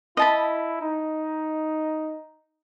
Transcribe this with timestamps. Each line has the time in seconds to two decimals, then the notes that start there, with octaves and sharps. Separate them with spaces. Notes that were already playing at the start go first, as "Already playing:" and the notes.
0.17 E4 D#5 A5 B5
0.81 D#4